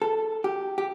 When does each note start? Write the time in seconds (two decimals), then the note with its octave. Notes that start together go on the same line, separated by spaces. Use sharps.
0.02 A4
0.44 G4
0.78 G4